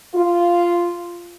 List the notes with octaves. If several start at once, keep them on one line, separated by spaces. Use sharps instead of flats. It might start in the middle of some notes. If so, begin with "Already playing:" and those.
F4